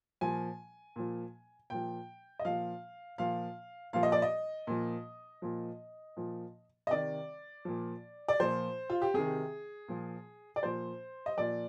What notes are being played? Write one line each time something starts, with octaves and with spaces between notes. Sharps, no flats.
A#2 F3 G#5
A#2 F3
A#2 F3 G5
D#5
A#2 F3 F5
A#2 F3 F5
A#2 F3 F5
D#5
D5
D#5
A#2 F3
A#2 F3
A#2 F3
D#5
C3 D#3 D5
A#2 F3
D5
A#2 F3 C5
F4
G4
C3 D#3 G#4
A#2 F3
D5
A#2 F3 C5
D#5
A#2 F3 D5